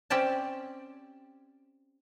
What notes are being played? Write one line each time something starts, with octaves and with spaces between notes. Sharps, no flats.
C4 C#4 G4 D5 A5